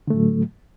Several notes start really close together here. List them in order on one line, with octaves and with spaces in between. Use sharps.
D3 A3 A2 F#3